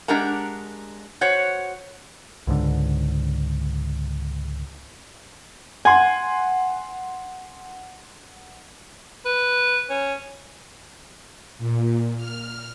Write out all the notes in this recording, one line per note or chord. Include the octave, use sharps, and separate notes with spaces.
G#3 D4 G4 A#4 F#5 A#5
F#4 C5 C#5 F#5
C#2 G#2 D3
F#5 G#5 C6
B4
C#4
A#2
F6